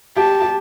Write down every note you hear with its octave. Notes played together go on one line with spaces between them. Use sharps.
G4 A5
G4